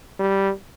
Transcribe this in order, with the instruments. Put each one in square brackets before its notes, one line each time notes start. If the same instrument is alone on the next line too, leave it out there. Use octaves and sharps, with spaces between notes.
[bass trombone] G3